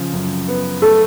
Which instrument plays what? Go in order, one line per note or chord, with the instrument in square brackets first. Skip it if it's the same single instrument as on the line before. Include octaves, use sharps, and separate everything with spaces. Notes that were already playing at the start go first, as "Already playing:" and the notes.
Already playing: [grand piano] C#3 F3
F#2
B3
[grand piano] A3 [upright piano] A4